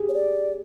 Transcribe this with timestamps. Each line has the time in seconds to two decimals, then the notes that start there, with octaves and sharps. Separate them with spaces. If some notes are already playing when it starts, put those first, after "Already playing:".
Already playing: G4 G#4
0.09 C#5
0.14 D5